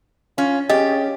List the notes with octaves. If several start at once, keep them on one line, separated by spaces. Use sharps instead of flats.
C#4 F4
C#4 G4 G#4 D#5